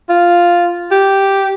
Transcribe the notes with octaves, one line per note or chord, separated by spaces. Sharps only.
F4
G4